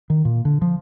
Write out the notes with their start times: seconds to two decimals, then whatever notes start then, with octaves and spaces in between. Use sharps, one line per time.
0.10 D#3
0.25 A#2
0.45 D3
0.62 F3